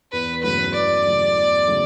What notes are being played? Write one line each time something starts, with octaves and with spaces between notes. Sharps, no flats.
E2 B4
C#3 F#3 A3 E4 B4
E2 D5
C#3 F#3 A3 E4
E2
C#3 F#3 A3 E4